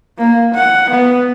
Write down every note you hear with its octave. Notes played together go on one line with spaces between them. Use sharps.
A#3
F#5
B3